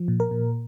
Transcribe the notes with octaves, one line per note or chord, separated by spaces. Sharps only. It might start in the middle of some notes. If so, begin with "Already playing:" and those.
Already playing: F3
A#2
A#4
A#2